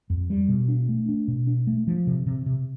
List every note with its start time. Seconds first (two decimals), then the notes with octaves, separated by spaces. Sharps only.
0.10 F2
0.30 G3
0.49 B2
0.68 D4
0.89 A3
1.09 D4
1.28 B2
1.47 D4
1.67 A3
1.87 F3
2.07 C3
2.26 C3
2.46 C3